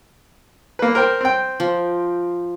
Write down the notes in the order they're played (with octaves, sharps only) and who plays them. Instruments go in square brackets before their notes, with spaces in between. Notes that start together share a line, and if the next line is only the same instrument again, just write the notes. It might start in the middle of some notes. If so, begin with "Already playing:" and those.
[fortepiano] A#3 B4
A#4 C5 G5
C4 G5
[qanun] F3